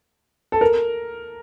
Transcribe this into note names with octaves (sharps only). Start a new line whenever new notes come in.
A4
A#4